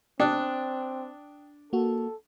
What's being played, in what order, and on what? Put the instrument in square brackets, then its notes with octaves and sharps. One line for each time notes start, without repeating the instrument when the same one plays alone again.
[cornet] C4 [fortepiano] D4 [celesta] G5 D#6 F#6
[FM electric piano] A#3 F#4 [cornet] A4